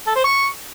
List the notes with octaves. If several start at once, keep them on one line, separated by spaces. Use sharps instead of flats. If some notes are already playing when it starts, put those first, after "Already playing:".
A4
C5
C#6